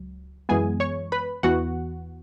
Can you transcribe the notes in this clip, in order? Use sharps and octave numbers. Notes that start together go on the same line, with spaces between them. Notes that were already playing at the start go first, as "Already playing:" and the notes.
Already playing: C#2 F#3
F#2 E3 G#3 B3 G#4 G#5
C#5 C#6
B4 B5
E2 E3 B3 F#4 F#5